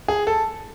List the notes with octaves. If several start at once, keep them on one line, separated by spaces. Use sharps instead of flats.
G#4
A4